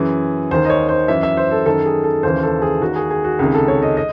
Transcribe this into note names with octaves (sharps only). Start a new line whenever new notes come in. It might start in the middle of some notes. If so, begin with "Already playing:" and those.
Already playing: F#2 E3 G#4
D#2 D#3 C5
D#5
C#5
C5
F#2 E3 E5
E5
C5
A4
F#2 D#3 A4
G#4
A4
D#2 C#3 E3 C5
A4
G#4
D#2 D#3 F#4
G#4
G#4
F#4
C#2 C3 D#3 G#4
A4
C#5
D#5
D#5